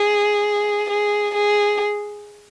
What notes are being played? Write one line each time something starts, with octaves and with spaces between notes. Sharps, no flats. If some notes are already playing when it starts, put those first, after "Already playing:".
Already playing: G#4
G#4
G#4